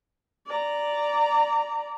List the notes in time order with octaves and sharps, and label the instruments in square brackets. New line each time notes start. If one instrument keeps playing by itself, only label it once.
[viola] D5 A#5